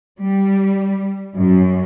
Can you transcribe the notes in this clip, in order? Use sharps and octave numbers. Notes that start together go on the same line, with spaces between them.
G3
F#2